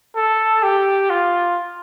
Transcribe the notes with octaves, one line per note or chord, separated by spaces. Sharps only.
A4
G4
F4